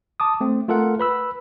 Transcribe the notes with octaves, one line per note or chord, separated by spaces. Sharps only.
A5 D6 D#6
A3 C4
A3 F4 A4 A#4 F#5
B4 B5 E6